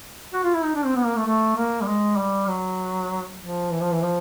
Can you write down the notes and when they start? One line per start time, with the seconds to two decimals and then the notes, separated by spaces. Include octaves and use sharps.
0.33 F#4
0.44 F4
0.54 E4
0.64 D#4
0.75 D4
0.85 C4
0.95 B3
1.04 A#3
1.16 A3
1.26 A3
1.56 A#3
1.81 G3
1.87 G#3
2.17 G3
2.48 F#3
3.40 F3
3.71 E3
3.81 F3
3.92 E3
4.02 F3